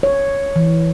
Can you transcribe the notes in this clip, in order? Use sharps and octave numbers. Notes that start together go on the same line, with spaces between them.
C#5
E3